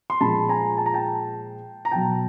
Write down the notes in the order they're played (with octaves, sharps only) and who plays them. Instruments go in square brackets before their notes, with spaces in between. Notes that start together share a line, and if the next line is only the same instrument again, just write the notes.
[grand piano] C6
A#2 F3 G#3 A5 B5
G#5 A#5
A5
A#5
G5 A5
A#5
B2 F#3 G5 A5